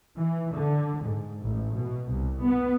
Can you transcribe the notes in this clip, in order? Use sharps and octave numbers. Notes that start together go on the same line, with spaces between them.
E3
D3
G#2
A1
B2
C2
B3